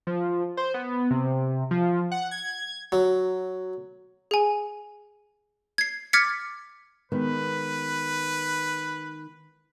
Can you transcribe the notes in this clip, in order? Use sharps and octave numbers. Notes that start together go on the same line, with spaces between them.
F3
C5
B3
C3
F3
F#5
G#6
F#3
G#4 G#5
G#6 C7
D6 F6 G#6 A6 B6 C#7
D#3 G#3 B3 B4